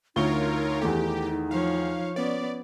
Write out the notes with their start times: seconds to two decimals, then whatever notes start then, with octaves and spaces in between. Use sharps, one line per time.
0.16 D2 D#4 F4 A#4 C#5 C#6 G7
0.81 E2 D#3 A3 G4
1.51 F3 C#5 F5
2.16 B3 C#4 D5